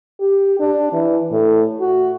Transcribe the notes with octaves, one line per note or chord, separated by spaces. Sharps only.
G4
D4
E3
A2
F#4